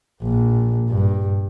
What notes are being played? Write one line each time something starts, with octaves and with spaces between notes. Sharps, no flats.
A#1
G2